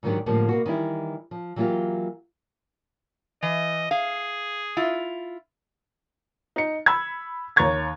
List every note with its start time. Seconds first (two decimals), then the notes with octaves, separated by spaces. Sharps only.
0.03 G#2 D3 D#3 F#3 D4 G4
0.26 A2 D3 F3 G3 G#3 A#3
0.49 B2 A#3 F#4
0.66 D#3 E3 G3 E4
1.31 F3
1.56 E3 F#3 A#3 E4 F4 G4
3.43 E3 D#5
3.91 G#4 F5
4.77 E4 F4
6.56 D#4 C#7
6.86 B5 E6 G#6
7.56 D#2 C#5 A#5 C#6 G#6 A6